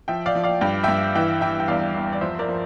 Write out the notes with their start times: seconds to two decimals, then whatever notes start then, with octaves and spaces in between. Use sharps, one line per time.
0.08 F3 E5 G5
0.26 D5 F5
0.35 F3
0.43 D5 F5
0.61 G2 G5
0.84 G2 E5 G5
1.15 E3 E5 G5
1.41 E3 E5 G5
1.60 G5
1.68 E2 D5 F5
1.94 E2
2.13 D5
2.21 F3 C5 E5
2.39 A#4 D5
2.48 F3